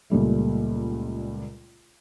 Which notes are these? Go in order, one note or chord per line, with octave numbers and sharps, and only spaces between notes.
C#2 A#2 G3 A3